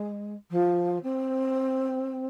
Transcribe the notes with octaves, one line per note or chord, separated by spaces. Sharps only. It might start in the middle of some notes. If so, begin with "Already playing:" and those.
Already playing: G#3
F3
C4